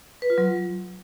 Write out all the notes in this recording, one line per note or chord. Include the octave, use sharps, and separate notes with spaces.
B4
F4
F#3